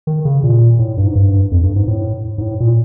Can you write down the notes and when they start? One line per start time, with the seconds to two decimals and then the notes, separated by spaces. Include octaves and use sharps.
0.07 D#3
0.25 C#3
0.43 A#2
0.79 A2
0.97 G2
1.06 G#2
1.16 G2
1.51 F2
1.63 G2
1.76 G#2
1.88 A2
2.38 G#2
2.42 A2
2.60 A#2